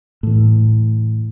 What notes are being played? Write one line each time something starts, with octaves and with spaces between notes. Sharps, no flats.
A2 E3